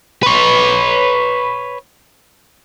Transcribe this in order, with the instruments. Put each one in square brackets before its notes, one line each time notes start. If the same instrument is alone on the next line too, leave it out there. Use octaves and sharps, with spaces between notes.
[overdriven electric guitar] B4 C#5